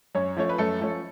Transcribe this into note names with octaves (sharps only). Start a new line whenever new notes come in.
F#2 C#4 C#5
F3 A3 C#4 C#5
B4
F#2 A3 A4
F3 A3 C#4